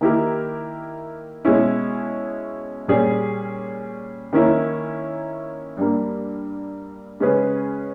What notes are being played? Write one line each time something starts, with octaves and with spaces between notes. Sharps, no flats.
D#3 A#3 E4 G4 A#4
B2 G#3 C#4 E4
A#2 G3 C#4 G#4
D#3 A#3 C#4 E4
G2 G3 A#3
C#3 G#3 C#4 G#4 B4